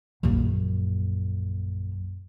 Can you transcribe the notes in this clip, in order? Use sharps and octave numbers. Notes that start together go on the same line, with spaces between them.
A#1 F#2